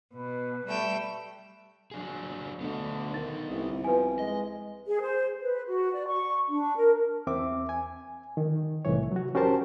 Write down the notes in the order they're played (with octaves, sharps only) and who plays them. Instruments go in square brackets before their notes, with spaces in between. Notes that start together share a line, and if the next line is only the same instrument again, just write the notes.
[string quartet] B2 [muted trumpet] B4
[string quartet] G3 A3 G5
[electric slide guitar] F#3 D4 G#4
[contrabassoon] D2 [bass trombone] D3 [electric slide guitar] B3 D#4
[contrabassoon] D#3 [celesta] A6
[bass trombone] G1 [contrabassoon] C2
[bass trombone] F3 [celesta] B4 G#5
[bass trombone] G#3 [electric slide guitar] D#5
[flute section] G#4
C5
B4
F#4
D5
C#6
D4
A#4
[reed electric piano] E2 C4 E5 D6
G#5
D#3
C2 A2 E3 C#5
F#3 F#4
C#4 F#4 G4 A#4 C5 A5